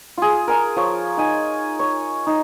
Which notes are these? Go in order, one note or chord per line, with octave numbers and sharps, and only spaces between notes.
F4 G#4
A#4 G#5 A#5
F3 C#5
D#4 G#5
C#5
D#4